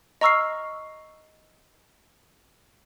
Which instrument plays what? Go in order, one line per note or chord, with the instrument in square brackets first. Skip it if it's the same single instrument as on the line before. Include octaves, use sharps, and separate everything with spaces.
[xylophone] D#5 A#5 C#6 E6 F6 C7